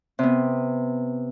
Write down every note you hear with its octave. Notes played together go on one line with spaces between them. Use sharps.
C3 B3